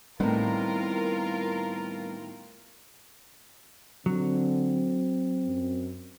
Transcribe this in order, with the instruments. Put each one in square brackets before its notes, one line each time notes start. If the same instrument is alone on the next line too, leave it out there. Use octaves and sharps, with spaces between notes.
[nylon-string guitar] A2 D#3 [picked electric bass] G3 B3 C4 [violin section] F4 A#4
[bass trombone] D3 [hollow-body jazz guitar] F#3 [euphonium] C4
[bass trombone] F#2